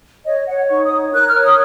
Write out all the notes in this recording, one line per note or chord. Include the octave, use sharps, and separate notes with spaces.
C#5 D#5
C#5 F#5
D#4 C#6
D#6
C#5
A#4 F#6
F6
C#5
D#6